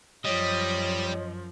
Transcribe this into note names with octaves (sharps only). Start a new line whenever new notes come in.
F#2 F3 G3 C#5 D#5